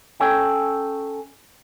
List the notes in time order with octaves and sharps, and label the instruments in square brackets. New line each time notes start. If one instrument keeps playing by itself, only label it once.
[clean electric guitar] C#4 A4 C#5 G5